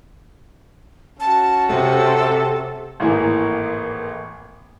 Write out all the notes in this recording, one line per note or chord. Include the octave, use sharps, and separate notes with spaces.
C#4 F#4 A5
C3 A4
G#1 A2 E3 A#3 G#4